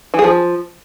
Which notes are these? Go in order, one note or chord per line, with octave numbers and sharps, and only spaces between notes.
E3
G#4
F3